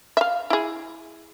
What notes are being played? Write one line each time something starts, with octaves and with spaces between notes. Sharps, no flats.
E5 F5
E4 G#4